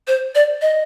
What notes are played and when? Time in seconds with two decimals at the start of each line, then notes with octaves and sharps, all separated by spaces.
0.07 C5
0.35 D5
0.61 D#5